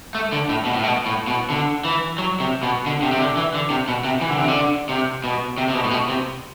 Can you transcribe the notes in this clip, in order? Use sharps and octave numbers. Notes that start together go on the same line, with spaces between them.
A3
D3
A2
B2
A2
B2
A2
B2
D3
E3
F#3
C3
B2
D3
C3
C3
D3
E3
D3
C3
B2
C3
E3
D3
C3
D3
C3
B2
C3
C3
B2
A2
B2
C3